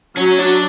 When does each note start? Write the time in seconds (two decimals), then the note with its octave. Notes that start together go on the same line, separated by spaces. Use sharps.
0.17 F#3 C#4
0.39 D4